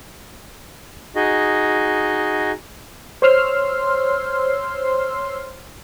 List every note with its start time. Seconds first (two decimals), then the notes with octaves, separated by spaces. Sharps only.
1.16 D#4 F#4 G#4 D#5
3.22 C5 C#5 C6 E6 F6 C7